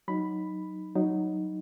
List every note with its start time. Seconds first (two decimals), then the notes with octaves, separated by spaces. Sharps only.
0.08 F#3 D#4 B5
0.95 F#3 D#4